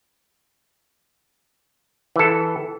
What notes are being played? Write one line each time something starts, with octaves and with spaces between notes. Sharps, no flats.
E3 A4